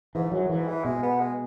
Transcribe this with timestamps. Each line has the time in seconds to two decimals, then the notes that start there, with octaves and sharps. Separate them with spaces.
0.15 G#2 E3
0.32 F#2 F#3
0.49 G#2 E3
0.68 E3
0.84 B2 G#3
1.03 B3
1.19 G#3